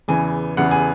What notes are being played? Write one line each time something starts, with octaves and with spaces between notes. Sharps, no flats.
E2 C#3 E3 G#5
E2 C#3 E3 F#5
G#5